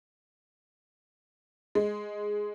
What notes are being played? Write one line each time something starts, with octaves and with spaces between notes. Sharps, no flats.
G#3